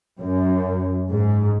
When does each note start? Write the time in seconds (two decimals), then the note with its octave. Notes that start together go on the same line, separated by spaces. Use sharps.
0.20 F#2
1.12 G#2